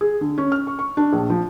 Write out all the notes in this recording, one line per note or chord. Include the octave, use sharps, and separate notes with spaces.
G#4
D3
C#4
F6
C#6
C#6
D4
A#1
F3